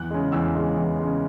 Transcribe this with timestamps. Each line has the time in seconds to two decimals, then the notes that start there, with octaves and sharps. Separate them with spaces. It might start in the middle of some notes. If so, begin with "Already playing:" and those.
Already playing: E2 F#6
0.10 C#3 G#3
0.32 E2 E6
0.55 C#3 G#3
0.77 E2
0.99 C#3 G#3